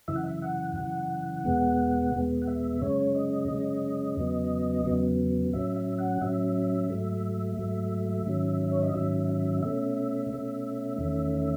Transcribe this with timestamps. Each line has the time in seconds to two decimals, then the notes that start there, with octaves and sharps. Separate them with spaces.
0.08 F#2 C#3 E3 E5
0.16 F#5
0.24 E5
0.42 F#5
0.76 F#2 C#3 E3 F#5
1.44 E2 B2 G#3 B3
2.13 E2 B2 G#3 B3
2.42 F#5
2.47 E5
2.81 F#2 C#3 G#3 C#4 C#5
3.15 D#5
3.48 F#2 C#3 G#3 C#4
4.17 E2 C#3 F#3 B3
4.85 E2 C#3 F#3 B3
5.53 A2 F#3 C#4 E5
5.76 E5
5.98 F#5
6.21 A2 F#3 C#4 E5
6.90 G#2 F#3 A3
7.58 G#2 F#3 A3
8.26 G#2 D#3 F#3 C#4
8.71 C#5
8.82 D#5
8.94 G#2 D#3 F#3 C#4 E5
9.29 E5
9.62 B2 A3 C#4 E5
10.30 B2 A3 C#4
10.98 E2 D#3 A3 C#4